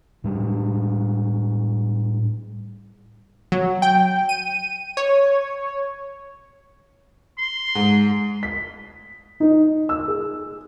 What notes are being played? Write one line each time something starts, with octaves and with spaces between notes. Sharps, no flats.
A2 G3 D4
F#3
G5
D#7
C#5
C6
G#2
B6
D#4
E6
G#4